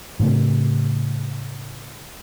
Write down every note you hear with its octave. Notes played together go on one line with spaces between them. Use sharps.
A2 C#3 A3 C4